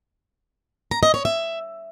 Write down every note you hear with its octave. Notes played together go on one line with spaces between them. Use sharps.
A#5
D#5
C#5
E5